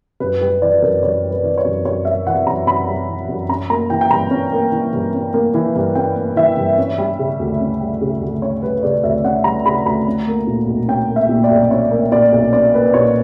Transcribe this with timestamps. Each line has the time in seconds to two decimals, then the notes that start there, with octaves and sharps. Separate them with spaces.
0.20 F#2 B4
0.41 G3 B4
0.62 E3 D5
0.72 B4
0.82 F#2 A#4
1.03 F#2 C#5
1.23 G3
1.31 B4
1.44 E3
1.58 C#5
1.65 F#2
1.85 F#2 C#5
2.05 G3 E5
2.26 E3 F#5
2.46 F#2 A#5
2.66 F#2 B5
2.88 G3
3.09 E3
3.29 F#2
3.49 C#4 A#5
3.70 A#3 A#5
3.90 E3 G5
4.01 G5
4.10 G2 A#5
4.31 C#4
4.52 A#3
4.72 E3
4.93 G2
5.14 C#4
5.34 A#3
5.54 E3
5.76 G2
5.95 C#4 G5
6.16 A#3
6.36 E3 E5
6.57 G2
6.78 C#4
6.98 G3
7.19 C#3
7.39 D2
7.60 C#4
7.80 G3
8.01 C#3
8.21 D2
8.42 C#4 C#5
8.62 G3 B4
8.83 C#3 D5
9.03 D2 E5
9.24 C#4 F#5
9.44 G3 A#5
9.66 C#3 B5
9.86 D2 A#5
10.06 C#4
10.27 A#3
10.47 A#2
10.67 B1
10.88 C#4 G5
11.10 A#3
11.16 E5
11.29 A#2
11.44 D5
11.51 B1
11.71 C#4 C#5
11.91 A#3
12.12 A#2 D5
12.32 B1
12.53 C#4 D5
12.73 A#3 B4
12.94 A#2 C#5